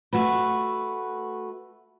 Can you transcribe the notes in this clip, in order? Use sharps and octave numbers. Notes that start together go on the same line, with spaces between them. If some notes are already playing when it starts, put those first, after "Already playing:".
A3 F#4 B4